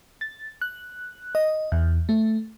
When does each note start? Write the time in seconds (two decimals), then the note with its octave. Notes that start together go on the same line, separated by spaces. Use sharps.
0.21 A6
0.61 F#6
1.35 D#5
1.72 E2
2.09 A3